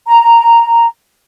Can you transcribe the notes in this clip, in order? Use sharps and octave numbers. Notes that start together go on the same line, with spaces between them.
A#5